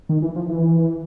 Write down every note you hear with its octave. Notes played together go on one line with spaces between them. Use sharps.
D#3
E3
F3
E3